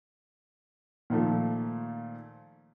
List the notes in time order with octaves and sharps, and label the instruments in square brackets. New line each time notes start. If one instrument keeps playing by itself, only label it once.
[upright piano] A#2 D#3 F3 A3